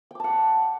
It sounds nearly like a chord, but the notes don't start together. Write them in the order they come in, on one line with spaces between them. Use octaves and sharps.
G5 D6 A5 F#5